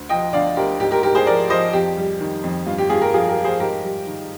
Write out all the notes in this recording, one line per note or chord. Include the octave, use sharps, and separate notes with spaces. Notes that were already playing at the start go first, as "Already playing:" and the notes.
Already playing: D2
F3 D#5 G5
D3 D5 F5
D2 G4 A#4
G#2 G4
G4 A#4
G#2 G4 A#4
G#4 C5
F3 A#4 D5
F3 C5 D#5
F2 G4
G3
D#3
F2
G2 F4
G4
G2 F4 G#4
G4 A#4
F3 F4 G#4
G4 A#4
F3
G#4 C5
G#2 G4 A#4
G3
D#3